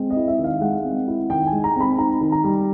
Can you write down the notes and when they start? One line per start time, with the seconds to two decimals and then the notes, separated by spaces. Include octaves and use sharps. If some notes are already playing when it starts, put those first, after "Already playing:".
Already playing: G#3 C4
0.10 D#5
0.16 E4
0.28 E5
0.39 D#3
0.44 F5
0.61 G#3 F#5
0.84 C4
1.07 E4
1.30 D#3 G5
1.47 G#5
1.52 G#3
1.64 A#5
1.76 C4 B5
1.98 D#4 A#5
2.21 D#3
2.32 A#5
2.44 G3